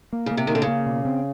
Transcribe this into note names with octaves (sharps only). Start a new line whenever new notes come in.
A#3
C#3 A#3
C3
D#3 A#3
D3
C#3
A#3
B2
C4